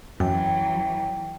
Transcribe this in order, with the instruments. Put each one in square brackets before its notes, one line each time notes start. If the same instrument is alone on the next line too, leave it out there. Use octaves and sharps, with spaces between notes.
[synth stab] F#2 [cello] E3 F#3 [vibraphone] G5